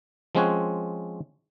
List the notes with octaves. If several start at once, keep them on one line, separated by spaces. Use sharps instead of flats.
F3 G#3 C4 C#4 C#5 F#5